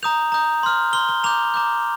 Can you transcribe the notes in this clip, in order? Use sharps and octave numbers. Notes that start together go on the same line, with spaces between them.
A#5 D#6 G6 F7
A#5 D#6 G6
C6 F6
C6 F6 G7
G7
A#5 D6 G6 F7
A#5 D6 G6